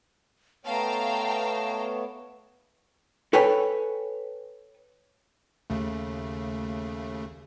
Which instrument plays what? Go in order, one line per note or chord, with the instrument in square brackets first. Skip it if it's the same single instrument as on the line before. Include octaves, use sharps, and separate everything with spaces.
[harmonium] A3 B3 C#5 [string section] F5 G5 A#5 [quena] A5
[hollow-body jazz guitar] A4 B4 C#5 G5 G#5 B5
[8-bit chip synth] D#2 C#3 A3